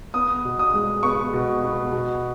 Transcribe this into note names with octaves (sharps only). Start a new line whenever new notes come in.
B3 D#6
B2
D#6
G#3
B3 C#6
B2
B3
B2